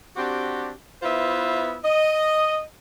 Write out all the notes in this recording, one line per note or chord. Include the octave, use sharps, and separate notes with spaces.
C4 D4 F#4 G4
B3 E4 F4 B4 C5 E5
D#5